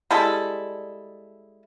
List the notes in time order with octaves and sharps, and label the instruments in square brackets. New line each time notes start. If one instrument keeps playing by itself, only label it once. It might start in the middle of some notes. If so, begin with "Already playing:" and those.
[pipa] G3 G#3 E4 A4